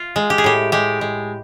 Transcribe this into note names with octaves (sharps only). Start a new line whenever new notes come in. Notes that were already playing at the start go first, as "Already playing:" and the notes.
Already playing: F4
G#3
G4
G#4
A2 G4
G#3 G4
G#3